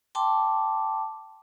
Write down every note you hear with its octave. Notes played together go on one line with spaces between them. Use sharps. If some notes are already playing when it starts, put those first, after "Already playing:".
G5 A5 C6 D6